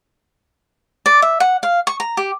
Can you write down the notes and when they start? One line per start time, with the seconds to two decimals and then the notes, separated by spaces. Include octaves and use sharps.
1.06 D5
1.22 E5
1.40 F#5
1.63 F5
1.87 C#6
2.00 A#5
2.17 G4